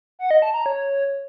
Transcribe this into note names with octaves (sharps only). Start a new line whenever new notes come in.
F#5
D#5
A5
A#5
C#5